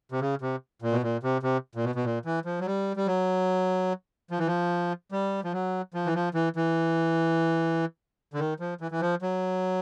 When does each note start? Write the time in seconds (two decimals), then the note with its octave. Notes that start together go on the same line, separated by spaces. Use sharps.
0.12 C3
0.21 C#3
0.42 C3
0.82 A#2
0.92 B2
1.03 A#2
1.23 C3
1.43 C3
1.75 A#2
1.84 B2
1.95 B2
2.04 A#2
2.25 E3
2.45 F3
2.61 F#3
2.66 G3
2.97 G3
3.07 F#3
4.31 F3
4.39 E3
4.47 F3
5.12 G3
5.44 F3
5.53 F#3
5.94 F3
6.06 E3
6.15 F3
6.34 E3
6.56 E3
8.34 D3
8.39 D#3
8.60 F3
8.81 E3
8.92 E3
9.01 F3
9.22 F#3